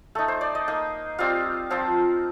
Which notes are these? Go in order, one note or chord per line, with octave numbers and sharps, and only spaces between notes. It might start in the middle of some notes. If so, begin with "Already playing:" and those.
A3 D#4 A4
C5
D5
D#5
A#3 D#4
G3 C4 F4 F5
F3 C4 F4